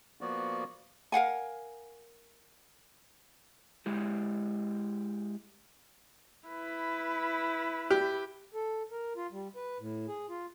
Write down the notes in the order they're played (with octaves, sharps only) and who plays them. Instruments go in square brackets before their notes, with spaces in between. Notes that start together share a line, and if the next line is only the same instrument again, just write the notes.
[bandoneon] F3 A#3 B3 F#4 D5
[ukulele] A#4 F5 F#5 G#5
[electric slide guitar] G#3 E4 G4
[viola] E4 B4
[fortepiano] G4
[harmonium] A4
A#4
F4
G3
B4
A2
G#4
F4